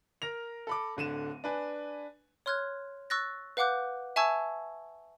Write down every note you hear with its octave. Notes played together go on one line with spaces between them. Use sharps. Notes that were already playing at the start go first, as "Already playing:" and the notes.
A#4 A#6 F7
A4 B5 D6
D1 D3 D#7 E7
D4 B4 G#5
C#5 C6 F6 F#6 G#6
C#6 E6 F#6 A6 A#6
B4 F5 F#5 D6 F#6 G6
E5 G#5 A5 C#6 E6 G#6